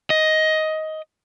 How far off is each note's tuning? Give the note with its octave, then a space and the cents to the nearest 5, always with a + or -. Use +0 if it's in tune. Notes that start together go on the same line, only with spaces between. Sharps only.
D#5 +15